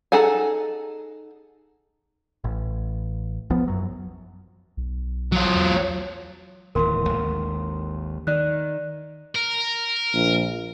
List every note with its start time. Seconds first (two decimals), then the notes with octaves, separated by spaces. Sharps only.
0.12 D#4 G#4 A4 F#5 G#5
2.44 A1
3.50 B1 F3 B3
3.68 F#2 F#3
4.77 B1
5.32 F#3 F4
5.56 E2
6.75 D1 D#2 E3 A#4 C6
7.09 G#1 D#2
8.27 D#3 D5 F#6
9.35 A#4
10.14 A#1